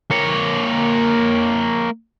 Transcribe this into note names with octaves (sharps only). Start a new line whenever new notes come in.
A#3 C#5